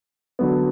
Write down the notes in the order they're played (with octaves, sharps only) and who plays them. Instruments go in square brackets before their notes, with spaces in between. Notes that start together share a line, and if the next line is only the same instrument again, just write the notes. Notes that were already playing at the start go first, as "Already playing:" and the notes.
[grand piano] D3 F#3 B3